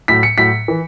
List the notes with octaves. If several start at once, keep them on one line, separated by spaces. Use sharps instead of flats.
A2 F#3 B6
C#7
A2 F#3 B6
E3